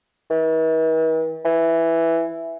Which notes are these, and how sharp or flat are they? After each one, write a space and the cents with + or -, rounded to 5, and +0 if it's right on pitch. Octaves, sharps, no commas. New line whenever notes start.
E3 -45
E3 +5